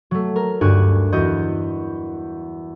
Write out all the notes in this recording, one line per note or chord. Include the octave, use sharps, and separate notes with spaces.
F#3 A3
A#4
D2 G2 F#4 G4 G#5 F#6
E2 F#4 D#5 G6